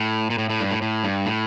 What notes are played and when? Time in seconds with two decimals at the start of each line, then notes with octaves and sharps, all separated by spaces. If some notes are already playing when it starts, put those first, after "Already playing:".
Already playing: A2
0.30 A#2
0.38 A2
0.50 A2
0.61 G2
0.71 A2
0.82 A2
1.04 G2
1.26 A2